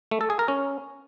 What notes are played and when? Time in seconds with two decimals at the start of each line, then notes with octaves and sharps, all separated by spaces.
0.11 A3
0.21 A4
0.30 G#4
0.39 A#4
0.48 C#4